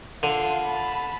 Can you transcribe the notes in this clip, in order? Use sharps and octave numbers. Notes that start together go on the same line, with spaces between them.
D3 F4 C6
A5 B5